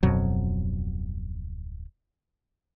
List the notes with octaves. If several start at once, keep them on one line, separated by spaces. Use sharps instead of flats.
D1 F2 B2 F#3